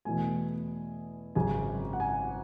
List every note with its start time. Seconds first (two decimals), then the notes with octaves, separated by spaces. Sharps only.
0.05 E2 B2 A3 G#5
1.35 G#1 F#2 C#3 G#3 G#5
1.93 F#5
2.00 G#5